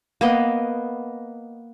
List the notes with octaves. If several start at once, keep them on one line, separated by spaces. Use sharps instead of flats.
A#3 B3 D#5